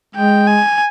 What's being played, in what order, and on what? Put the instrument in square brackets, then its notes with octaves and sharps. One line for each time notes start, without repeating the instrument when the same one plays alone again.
[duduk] G#3 [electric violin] G5
[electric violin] G#5